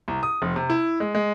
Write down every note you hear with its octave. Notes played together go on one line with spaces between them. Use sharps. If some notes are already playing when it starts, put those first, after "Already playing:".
C2
D#6
F1
C3
E4
G#3
G#3